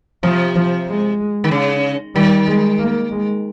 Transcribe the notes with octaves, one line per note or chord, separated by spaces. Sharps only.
C3 F3
F3
G#3
D#3
C#3
D#3 G3
G#3
A#3
G#3